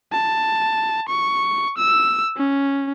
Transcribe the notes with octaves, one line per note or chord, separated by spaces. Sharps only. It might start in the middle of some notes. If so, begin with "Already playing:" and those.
A5
C#6
E6
C#4